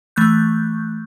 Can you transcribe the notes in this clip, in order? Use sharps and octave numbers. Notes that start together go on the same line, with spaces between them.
E3 A3 C#6 F#6 G6